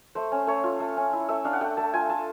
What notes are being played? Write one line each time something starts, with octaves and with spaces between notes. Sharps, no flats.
A3 C5
C#4
A3 C#5
F4
A3
C#4
E4
A3 E5
D4 F5
F#5
A3 G5
A3 A5
F4 G#5
F4 A5